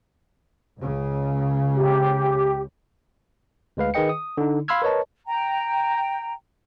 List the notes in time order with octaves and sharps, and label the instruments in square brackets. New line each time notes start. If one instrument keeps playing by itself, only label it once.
[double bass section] C#2 C#3
[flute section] G4
[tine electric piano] D2 G#3 B4 F5
D#3 G#4 B4 D#5 G5 C#7
D#6
D3 D#4
F5 B5 C6 E6 F6 G#6
A#4 B4 C#5 D#5 A5
[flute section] G5 A#5